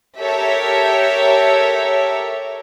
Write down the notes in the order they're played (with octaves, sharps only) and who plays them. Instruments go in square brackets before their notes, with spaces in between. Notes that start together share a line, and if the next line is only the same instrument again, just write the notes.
[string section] G4 A4 A#4 C#5 E5